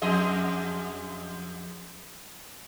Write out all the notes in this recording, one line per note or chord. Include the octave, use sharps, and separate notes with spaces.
F2 G#4 D#5